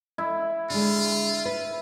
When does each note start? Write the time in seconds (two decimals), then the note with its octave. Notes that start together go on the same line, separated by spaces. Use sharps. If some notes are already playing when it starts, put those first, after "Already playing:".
0.18 E4
0.70 D3 G#3 F4
1.45 B4